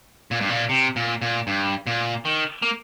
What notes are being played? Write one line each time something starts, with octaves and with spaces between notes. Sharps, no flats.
A#2
G2
A#2
C3
A#2
A#2
G2
A#2
D#3
A#3